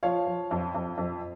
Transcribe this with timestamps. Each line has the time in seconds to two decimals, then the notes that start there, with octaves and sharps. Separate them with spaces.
0.03 F3 C#5 F5
0.27 F3
0.51 F2
0.75 F2
0.98 F2